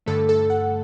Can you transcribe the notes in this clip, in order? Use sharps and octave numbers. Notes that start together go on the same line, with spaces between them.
G2 D3 A3 A4
A4
F#5